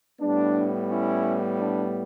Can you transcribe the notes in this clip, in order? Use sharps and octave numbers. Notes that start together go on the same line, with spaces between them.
A2 G3 B3 D4
C#4 E4
D4